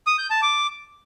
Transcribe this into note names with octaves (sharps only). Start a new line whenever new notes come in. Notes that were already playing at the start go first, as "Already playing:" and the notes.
D#6
G6
A5
D6